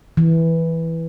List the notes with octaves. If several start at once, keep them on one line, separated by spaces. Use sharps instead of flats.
E3